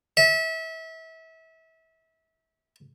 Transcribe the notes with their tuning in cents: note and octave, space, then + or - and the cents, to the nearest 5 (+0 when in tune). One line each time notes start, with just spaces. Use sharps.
E5 -30